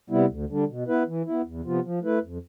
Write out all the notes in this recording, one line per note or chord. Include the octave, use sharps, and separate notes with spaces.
C3 G3 B3 E4
D2
D3 G3 D4
B2
B3 E4 B4
E3
B3 E4
E2
C3 F3 B3 F4
F3
A3 E4 B4
F2